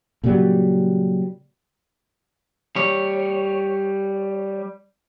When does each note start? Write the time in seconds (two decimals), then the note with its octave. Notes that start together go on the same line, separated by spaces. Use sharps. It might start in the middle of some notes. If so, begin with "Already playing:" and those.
0.24 A#2 C#3 F#3 G3
2.76 G3 C#5